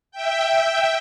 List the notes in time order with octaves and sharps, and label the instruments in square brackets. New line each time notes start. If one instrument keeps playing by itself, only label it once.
[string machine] E5 G5